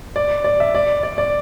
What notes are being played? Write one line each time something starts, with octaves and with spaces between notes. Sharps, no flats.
D5
D5
E5
D5
D5
D5